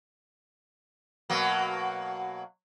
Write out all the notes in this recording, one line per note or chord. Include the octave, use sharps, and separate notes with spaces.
B2 F#3 A#3